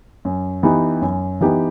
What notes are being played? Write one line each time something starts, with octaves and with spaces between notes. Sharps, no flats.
F#2
E3 B3 D#4 G4
F#2
E3 B3 D#4 G4